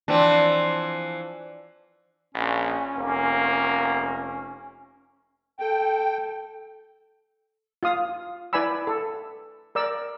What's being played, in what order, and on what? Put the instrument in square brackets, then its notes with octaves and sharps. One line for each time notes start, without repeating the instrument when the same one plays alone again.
[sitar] E3 F3 C4 [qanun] D4
[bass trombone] A#1 [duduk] C#4
[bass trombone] F1 [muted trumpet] A#3
[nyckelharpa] A4 [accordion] G5
[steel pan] F4 F5 D#6
E4 B4 D5 G#5 B5 E6
A4
A#4 D5 E6